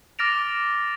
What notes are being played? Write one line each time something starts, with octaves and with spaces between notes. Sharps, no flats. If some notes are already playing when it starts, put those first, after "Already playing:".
D6 F6 A6 A#6 D7 F7